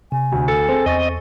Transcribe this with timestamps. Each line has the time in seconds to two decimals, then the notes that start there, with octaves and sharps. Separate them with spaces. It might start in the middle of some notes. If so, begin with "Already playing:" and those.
0.12 C3 G#5
0.32 D2
0.48 A4
0.69 C4 G#4
0.86 E2 D#5 C#6 A6